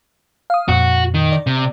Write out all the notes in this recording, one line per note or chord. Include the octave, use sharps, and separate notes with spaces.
F5 D#6
F2 A#2 F#4
D#3
D5
C3